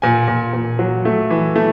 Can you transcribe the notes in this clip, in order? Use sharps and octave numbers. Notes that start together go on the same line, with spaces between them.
A#2 G#5
A#2
A#2
F#3
A3
E3
A3